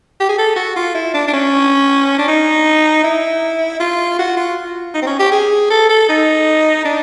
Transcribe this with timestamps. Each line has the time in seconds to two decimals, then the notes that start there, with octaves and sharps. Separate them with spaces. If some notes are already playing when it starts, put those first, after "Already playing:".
0.21 G4
0.29 G#4
0.39 A4
0.56 F#4
0.76 F4
0.95 E4
1.14 D4
1.28 D4
1.34 C#4
2.19 D4
2.28 D#4
3.04 E4
3.80 F4
4.19 F#4
4.37 F4
4.95 D#4
5.02 C4
5.07 C#4
5.20 G4
5.32 G#4
5.71 A4
5.90 A4
6.09 D#4
6.85 D4